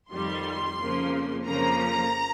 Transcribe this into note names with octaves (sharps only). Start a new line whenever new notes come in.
F2 D#3 G3 C6
F2 C#3 F3 A#3
F2 C#3 F3 A#3 A#5